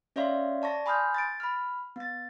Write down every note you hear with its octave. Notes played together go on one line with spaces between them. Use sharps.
C#4 C#5 D5 E5 F5 C6
D5 A5 C#6 A#6
G#5 B5 C6 D#6 F6 G6
A6 D7
B5 F6
B3 A6